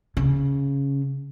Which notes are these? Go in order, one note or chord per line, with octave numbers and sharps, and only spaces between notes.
C#3